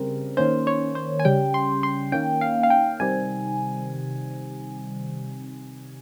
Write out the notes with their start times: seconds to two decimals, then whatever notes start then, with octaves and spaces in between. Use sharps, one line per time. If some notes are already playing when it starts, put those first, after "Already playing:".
Already playing: C#3 G3 C4 A#4
0.37 D#3 A#3 C#4 C5
0.67 C#5
0.95 C5
1.19 G#5
1.25 C#3 G3 C#4 G5
1.54 C6
1.83 C6
2.12 D#3 A#3 C#4 G5
2.41 F5
2.63 F5
2.70 G5
3.00 C3 D#3 G3 C4 G#5